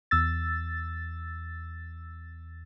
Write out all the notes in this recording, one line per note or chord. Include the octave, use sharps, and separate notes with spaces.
E2 E6 A6